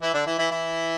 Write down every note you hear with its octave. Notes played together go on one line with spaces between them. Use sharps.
E3 E4
D3 D4
E3 E4
E3 E4
E3 E4